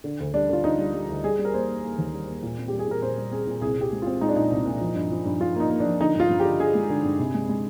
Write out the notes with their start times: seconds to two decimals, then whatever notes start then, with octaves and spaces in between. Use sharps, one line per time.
0.04 D3
0.20 D2
0.34 G3 D4
0.49 D3 F4
0.64 D3 D#4
0.79 G3
0.94 G3
1.09 D2
1.24 G3 G#4
1.39 G3
1.45 A#4
1.54 A#3 C5
1.69 A#3
1.84 A#3
1.98 D#2
2.13 G3
2.28 A#3
2.43 A#2
2.58 C4
2.68 G3 G4
2.79 G#4
2.87 A#2 A#4
3.02 A#2 C5
3.17 G3
3.32 C4 G#4
3.47 A#2
3.61 C2 G#4
3.77 C2 G4
3.92 G#3
4.02 C4 F4
4.21 G#3 D#4
4.29 D4
4.36 A#2 D#4
4.51 C2
4.66 A#2
4.81 F3
4.95 G2
5.11 F3
5.26 G2
5.40 G2 F4
5.55 A#3 D#4
5.70 A#3
5.80 D4
5.86 F3
6.00 D3 D#4
6.15 G2 F4
6.29 G2
6.40 G4
6.45 D3
6.59 D3 G#4
6.75 G#3
6.90 D3
7.04 G2
7.19 C3
7.34 G#3
7.49 G#3